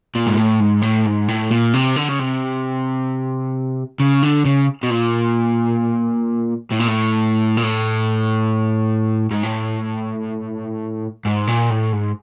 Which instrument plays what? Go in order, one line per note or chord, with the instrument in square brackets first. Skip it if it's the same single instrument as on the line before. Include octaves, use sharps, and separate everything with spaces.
[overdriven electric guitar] A#2
G#2
A2
G#2
A2
G#2
A2
A#2
C3
D3
C#3
C3
C#3
D3
C#3
B2
A#2
A2
A#2
A2
A#2
A2
G#2
A2
G#2
A#2
A2
G#2